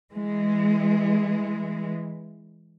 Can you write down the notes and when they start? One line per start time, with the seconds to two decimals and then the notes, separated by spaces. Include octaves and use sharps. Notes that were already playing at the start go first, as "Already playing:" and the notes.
0.14 E3 G#3